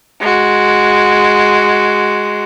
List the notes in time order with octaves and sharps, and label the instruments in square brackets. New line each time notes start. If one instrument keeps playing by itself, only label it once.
[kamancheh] G#3 F#4